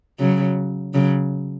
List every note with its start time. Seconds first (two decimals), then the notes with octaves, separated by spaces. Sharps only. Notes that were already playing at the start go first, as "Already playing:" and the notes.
0.19 C#3 F#3
0.94 C#3 F#3